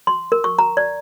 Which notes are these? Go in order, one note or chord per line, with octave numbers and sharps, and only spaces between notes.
C6
A#4
C#6
A#5
D5